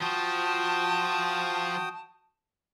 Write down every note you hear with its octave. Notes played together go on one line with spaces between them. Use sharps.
F3 F#4 G5 A5 D#6